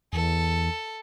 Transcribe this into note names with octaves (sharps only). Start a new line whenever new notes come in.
E2 A4